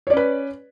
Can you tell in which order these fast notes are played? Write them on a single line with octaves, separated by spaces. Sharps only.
C#5 D5 C#4 B4